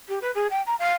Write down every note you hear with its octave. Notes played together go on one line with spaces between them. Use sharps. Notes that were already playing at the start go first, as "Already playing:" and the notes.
G4
B4
G#4
G5
A#5
F5